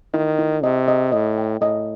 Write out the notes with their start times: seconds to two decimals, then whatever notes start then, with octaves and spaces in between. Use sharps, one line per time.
0.14 D#3 E4
0.39 E4
0.63 C3 D#5
0.88 D#5
1.12 A2 D#5
1.38 G5
1.61 A2 D#5